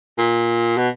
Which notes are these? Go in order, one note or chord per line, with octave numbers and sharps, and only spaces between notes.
A#2
B2